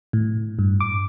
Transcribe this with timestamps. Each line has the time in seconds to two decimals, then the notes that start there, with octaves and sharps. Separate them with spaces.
0.13 A2
0.59 G2
0.81 D6